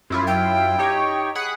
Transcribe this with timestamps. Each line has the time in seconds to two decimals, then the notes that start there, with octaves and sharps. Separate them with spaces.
0.10 F#2 E4 F4
0.27 G5
0.79 D#4 G4 C#5
1.35 G#4 F#5 B5